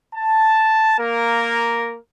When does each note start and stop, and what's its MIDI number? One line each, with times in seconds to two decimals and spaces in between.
0.14 0.97 81
0.99 1.97 58
0.99 1.97 70